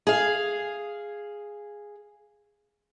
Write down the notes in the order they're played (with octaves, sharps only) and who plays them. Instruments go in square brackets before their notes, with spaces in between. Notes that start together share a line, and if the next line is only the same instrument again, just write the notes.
[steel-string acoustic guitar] G#4 F5